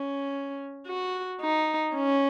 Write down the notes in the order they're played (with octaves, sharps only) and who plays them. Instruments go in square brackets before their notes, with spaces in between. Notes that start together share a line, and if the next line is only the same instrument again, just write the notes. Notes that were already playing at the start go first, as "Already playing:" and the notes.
Already playing: [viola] C#4
F#4
D#4
C#4